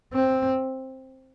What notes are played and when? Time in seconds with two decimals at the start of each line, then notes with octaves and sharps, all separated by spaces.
0.13 C4